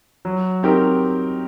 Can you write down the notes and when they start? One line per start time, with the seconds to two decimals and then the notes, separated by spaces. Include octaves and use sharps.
0.25 F#3
0.63 C4 D#4 G4 A#4